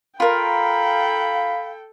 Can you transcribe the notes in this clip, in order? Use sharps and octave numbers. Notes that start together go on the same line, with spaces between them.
F4 A4 A#4 F5 G5 B5